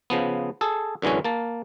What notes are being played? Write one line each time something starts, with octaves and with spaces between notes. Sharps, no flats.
C#3 F3 B3
G#4 A4
F#2 D3 E3 G#3 C#4
A#3 A5